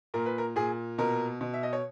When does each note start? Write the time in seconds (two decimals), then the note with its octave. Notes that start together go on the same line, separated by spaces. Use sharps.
0.14 A#2 A#4
0.26 B4
0.38 A#4
0.56 A#2 G#4
0.98 B2 A#4
1.41 B2
1.54 E5
1.63 D#5
1.73 C#5